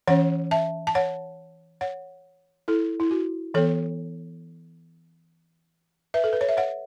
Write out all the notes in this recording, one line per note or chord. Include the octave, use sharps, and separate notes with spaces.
E3 C#4 C#5 F#5
E5 A5
A5
C#5 F#5
C#5 F#5
E4 A4
E4
F#4
E3 B3 A4 C#5
B4 E5
A4
B4
C#5
E5
C#5 F#5